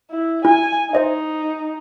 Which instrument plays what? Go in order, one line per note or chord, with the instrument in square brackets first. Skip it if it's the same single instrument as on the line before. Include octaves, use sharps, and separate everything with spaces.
[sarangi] E4
[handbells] E4 [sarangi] G#5
[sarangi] D#4 [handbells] C5 D#5 E5